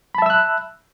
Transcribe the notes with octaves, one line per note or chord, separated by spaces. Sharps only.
E5 A5 B5 E6 F#6